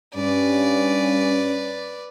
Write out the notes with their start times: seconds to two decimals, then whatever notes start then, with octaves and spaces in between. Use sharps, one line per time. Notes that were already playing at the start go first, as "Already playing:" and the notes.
0.15 G2 C#4 B4 D5